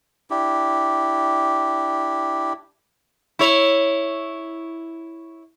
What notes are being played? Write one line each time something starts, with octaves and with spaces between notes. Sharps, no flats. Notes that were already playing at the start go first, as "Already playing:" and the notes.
D4 E4 G4
E4 C#5